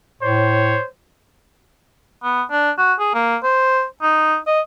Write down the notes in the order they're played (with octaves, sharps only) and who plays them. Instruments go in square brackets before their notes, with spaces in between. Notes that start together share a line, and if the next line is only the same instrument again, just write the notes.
[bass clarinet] A2 [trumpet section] C5 C#5
[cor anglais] B3
D4
F#4
G#4
A#3
C5
D#4
D#5